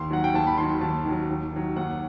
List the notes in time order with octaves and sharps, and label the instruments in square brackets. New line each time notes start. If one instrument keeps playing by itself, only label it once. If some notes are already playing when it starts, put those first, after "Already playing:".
Already playing: [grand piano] D#2 C6
D#3 F#3 F#5
G5
D#2 A5
B5
D#3 F#3 C6
D#2 A5
D#3 F#3
D#2
D#3 F#3
D#2 F#5